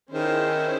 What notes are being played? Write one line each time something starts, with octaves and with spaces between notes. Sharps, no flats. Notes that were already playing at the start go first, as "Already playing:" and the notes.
D#3 C#4 E4 G#4 C5